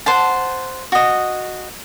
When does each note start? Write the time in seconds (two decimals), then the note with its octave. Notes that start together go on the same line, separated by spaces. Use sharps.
0.06 C5 F#5 A5
0.92 F#4 D#5